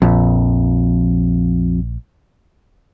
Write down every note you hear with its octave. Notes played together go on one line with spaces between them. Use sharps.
A#1 F2